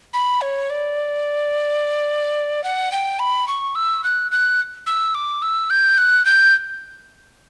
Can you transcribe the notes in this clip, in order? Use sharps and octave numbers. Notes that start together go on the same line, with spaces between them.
B5
C#5
D5
F#5
G5
B5
C#6
E6
F#6
F#6
E6
D6
E6
G6
F#6
G6